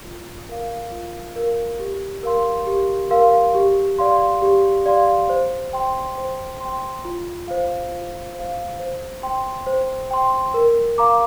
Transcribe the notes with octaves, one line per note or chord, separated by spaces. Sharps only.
F4
A#4 F5
F4
A#4 F5
G4
A#4 F5 C6
G4
A#4 F5 C6
G4
D5 F5 C6
G4
D5 F5 C6
C5
G5 C6
C5
G5 C6
F4
C5 F5
F4
C5 F5
C5
G5 C6
C5
G5 C6
A#4
F5 A#5 D6